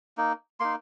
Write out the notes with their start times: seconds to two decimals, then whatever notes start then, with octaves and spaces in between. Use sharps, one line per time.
0.18 A#3 D#4
0.60 A#3 D#4 C6